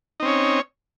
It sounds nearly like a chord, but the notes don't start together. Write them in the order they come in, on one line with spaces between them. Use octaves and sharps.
D#4 C4 C#4 C#5